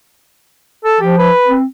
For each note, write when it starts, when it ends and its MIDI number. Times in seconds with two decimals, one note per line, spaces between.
0.85 1.00 69
1.01 1.31 53
1.01 1.17 67
1.18 1.54 71
1.48 1.65 60